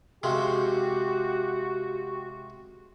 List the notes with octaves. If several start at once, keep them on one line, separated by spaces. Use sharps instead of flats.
C3 F3 G#3 F#4 G4